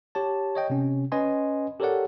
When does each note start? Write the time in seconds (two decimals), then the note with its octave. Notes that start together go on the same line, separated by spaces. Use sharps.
0.15 G4 C#5 A5
0.55 C#5 D#5 G5
0.70 C3 C#4
1.12 C#4 B4 D#5 G#5 C6
1.80 G4 A4 A#4 C#5 D5 F#5